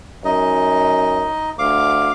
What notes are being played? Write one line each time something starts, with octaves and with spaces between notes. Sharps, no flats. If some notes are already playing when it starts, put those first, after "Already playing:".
F#2 D#4 D#5
D2 F5 D6